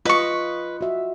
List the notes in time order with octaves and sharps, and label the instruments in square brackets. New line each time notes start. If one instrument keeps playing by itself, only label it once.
[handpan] F4 D#5 [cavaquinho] B4 C#6
[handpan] F#4 E5